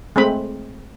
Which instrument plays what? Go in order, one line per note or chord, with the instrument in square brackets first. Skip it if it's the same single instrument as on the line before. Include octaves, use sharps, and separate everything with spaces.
[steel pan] G#3 A3 C4 B5